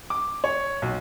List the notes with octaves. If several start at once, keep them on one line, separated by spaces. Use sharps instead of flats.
D6
C#5
B1